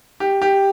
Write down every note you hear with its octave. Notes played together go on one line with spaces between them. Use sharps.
G4
G4